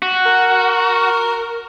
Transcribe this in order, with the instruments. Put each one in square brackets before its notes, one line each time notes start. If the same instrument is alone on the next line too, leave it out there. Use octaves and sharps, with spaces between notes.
[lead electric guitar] F#4
[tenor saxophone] A#4